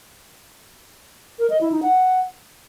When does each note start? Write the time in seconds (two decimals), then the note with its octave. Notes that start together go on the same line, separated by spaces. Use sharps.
1.39 A#4
1.50 D#5
1.61 E4
1.72 D#4
1.83 F#5